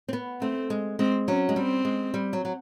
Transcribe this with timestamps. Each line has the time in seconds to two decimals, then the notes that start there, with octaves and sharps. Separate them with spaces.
0.08 C4
0.13 B3
0.41 A3 C4
0.70 G#3
0.99 G#3 C4
1.28 F#3 C#4
1.49 G#3
1.56 G3 C4
1.85 G#3
2.14 G3
2.33 F#3
2.45 F#3